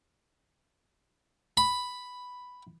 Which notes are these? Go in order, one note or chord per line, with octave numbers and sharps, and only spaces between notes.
B5